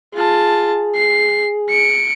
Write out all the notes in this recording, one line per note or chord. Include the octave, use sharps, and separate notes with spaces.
F4 G#4 A5
C7
C#7 D7